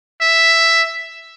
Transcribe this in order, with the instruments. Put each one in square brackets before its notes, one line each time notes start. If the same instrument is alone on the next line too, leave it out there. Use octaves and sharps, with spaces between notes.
[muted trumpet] E5